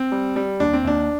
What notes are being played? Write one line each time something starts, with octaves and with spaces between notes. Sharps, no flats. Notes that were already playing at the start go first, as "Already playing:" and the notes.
Already playing: C4
G3
G3
D#2 D4
C4
D#2 D4